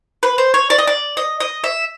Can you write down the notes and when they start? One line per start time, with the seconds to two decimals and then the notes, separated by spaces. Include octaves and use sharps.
0.23 B4
0.38 C5
0.54 C#5
0.70 D5
0.78 D#5
0.87 D5
1.17 D#5
1.40 D#5
1.64 E5